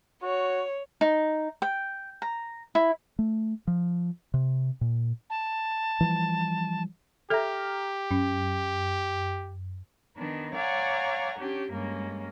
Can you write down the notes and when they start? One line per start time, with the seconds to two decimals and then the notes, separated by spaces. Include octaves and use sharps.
0.22 F#4 C#5
1.01 D#4
1.62 G5
2.22 A#5
2.75 E4
3.19 A3
3.67 F3
4.34 C3
4.81 A#2
5.30 A5
6.01 E3 F3 G3
7.30 G4 A4 E5 A#5 F6
8.11 F#2 C#4
10.17 D#3 B3 D4
10.55 C#5 D5 F5 F#5 G#5 A#5
11.38 C#4 D4 G4
11.72 G2 G#3 A#3 C#4